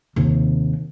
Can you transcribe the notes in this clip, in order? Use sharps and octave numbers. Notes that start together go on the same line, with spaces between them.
D#2 C3